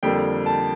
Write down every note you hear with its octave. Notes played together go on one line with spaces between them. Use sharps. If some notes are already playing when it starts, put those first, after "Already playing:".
F2 D3 G3 A#3 G5
A5